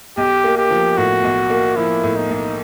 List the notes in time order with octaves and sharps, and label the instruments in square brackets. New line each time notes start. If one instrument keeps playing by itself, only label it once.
[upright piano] B1 [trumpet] G4
[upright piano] A#3
[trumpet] G4
[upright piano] F3
[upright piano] A2 [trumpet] F#4
[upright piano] B1
A#3
[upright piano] F3 [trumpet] E4
[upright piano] A2
[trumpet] D#4
[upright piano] B1